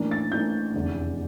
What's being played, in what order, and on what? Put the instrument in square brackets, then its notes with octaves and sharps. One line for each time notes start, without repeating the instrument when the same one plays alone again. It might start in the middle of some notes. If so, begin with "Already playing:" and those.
Already playing: [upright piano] A1 A2 E3 A#3 D4
A6
A1 A2 E3 A#3 D4 G6
F1 E2 D3